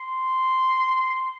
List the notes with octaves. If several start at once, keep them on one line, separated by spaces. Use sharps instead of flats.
C6